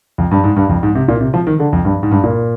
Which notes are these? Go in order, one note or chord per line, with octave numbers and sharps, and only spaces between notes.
F2
G2
G#2
G2
F2
G#2
C3
A#2
C3
F3
D#3
D3
F2
G2
G#2
G2
A#2